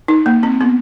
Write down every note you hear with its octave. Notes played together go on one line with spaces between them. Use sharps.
D#4
A#3
C4
B3